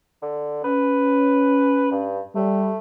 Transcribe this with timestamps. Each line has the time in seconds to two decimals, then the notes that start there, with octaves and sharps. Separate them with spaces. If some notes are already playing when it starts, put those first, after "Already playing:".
0.22 D3
0.64 C#4 B4
1.91 G2
2.35 G3 A3